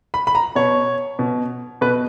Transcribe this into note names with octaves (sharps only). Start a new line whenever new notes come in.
B5
B5
A#5
B2 C#5
B2
B2 B4